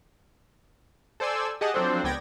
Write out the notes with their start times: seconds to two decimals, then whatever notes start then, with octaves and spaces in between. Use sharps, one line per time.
1.20 A4 C5 D5 G#5 E6
1.61 G4 G#4 D#5 F#5 A5
1.74 F3 F#3 C4 D4 A4 C5
2.04 C#2 B3 D5 G5 G#6 A#6